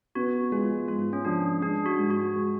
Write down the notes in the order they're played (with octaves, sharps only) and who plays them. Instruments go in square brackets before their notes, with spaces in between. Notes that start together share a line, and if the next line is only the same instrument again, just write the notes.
[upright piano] B3 [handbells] F#4
[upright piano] G#3 [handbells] F4
[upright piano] G#2 [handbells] F4
[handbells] C#4
[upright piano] F3 [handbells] D4
[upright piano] G#3 [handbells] D4
[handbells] F#4
[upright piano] G#2
[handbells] F#4
[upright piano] G#3